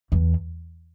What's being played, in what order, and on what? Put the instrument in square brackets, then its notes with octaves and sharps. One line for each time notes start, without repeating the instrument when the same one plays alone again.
[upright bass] E2